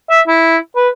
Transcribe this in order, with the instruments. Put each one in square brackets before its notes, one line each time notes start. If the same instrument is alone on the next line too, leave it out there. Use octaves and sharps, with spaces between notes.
[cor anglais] E5
E4
B4